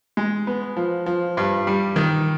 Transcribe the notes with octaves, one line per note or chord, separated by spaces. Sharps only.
G#3
B3
F3
F3
G2
G3
D#3